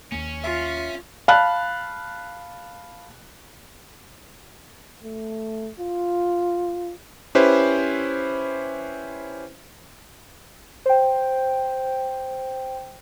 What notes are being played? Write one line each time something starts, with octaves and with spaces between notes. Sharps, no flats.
D#2 A#3 C#4
F4 E5
F5 A5 B5 F#6
A3
F4
C#4 E4 G4 B4 C5
C5 G5